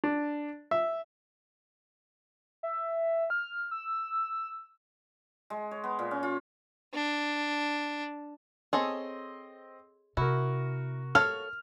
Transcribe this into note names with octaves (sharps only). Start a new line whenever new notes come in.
D4
E5
E5
F6
E6
G#3
C#5
B3
A#2
C#4
F4
D4
C4 G#4 A4 C#5 D#5 C6
C3 E4 F#4 A#4
A4 C#5 F5 F6